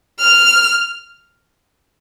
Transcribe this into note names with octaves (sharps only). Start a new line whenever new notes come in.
F6